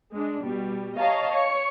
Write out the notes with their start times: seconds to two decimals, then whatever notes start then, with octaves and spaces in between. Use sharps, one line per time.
0.14 G#3 D4
0.43 B2 G3
0.99 C#5 D#5 F5 A5 A#5
1.32 C#5 C#7